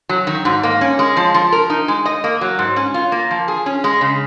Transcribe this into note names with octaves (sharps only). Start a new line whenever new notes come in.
F#3
D#3
G#2
A#3
C#4
G#3
F3
F3
A#4
D#4
G#3
D#5
A#3
F#3
G#2
C#4
F4
A#3
F3
G#4
C#4
G#3
C#3